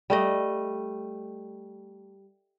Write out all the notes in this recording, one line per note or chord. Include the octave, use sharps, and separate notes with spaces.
G3 A3 D#5